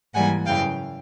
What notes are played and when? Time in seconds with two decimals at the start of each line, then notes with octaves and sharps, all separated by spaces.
0.13 G#2 E3 G3 A#3 F#5 G#5
0.45 F#2 C#3 E3 F5 G5